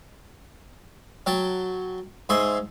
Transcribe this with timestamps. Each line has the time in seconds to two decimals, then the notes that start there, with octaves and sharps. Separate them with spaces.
1.26 F#3 G5 A5
2.29 G#2 G#4 E5 C6 C#6